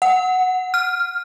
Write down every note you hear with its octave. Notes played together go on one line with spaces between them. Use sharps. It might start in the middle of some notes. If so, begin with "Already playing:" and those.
F#5
F6